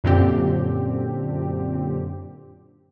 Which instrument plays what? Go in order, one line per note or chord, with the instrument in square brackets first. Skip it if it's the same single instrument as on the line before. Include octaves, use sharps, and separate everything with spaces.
[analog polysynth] F#2 A#2 D3 C4 G4